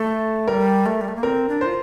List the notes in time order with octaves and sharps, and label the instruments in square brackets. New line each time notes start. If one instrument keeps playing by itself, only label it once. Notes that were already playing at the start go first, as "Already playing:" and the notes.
Already playing: [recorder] A3 [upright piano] A4
[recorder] G3 [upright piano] A#4
[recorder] A3
G3
A3
A#3
[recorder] C4 [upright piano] A#4
[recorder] D4
[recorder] F4 [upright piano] C5